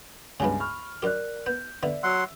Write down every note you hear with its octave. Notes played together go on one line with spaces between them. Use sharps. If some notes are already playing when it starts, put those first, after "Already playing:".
C#2 G2 C#3 F#3 B3 G#5
B5 C#6 F6
F#2 G4 A#4 D5 F#6
B3 G6
D3 B3 D5 E5
F#3 F#5 C6 E6